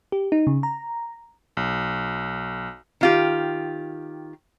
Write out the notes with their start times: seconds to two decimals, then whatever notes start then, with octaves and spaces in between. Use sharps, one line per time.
0.12 G4
0.32 D#4
0.47 C#3
0.63 A#5
1.57 B1
3.01 D#3 F4 G4